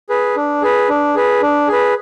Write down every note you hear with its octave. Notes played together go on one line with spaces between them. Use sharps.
G#4 B4
D4
G#4 B4
D4
G#4 B4
D4
G#4
B4